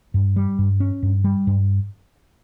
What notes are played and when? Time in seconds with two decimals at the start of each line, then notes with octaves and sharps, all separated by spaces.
0.14 G2
0.36 G3
0.59 G2
0.80 C#4
1.03 G2
1.24 G3
1.47 G2